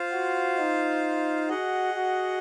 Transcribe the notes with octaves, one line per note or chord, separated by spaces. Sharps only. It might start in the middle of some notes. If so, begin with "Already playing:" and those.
Already playing: F4 C5 F5
F#4
D#4
F#4 G#4 D#5 F#5
F#4